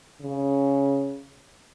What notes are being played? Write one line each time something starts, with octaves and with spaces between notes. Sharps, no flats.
C#3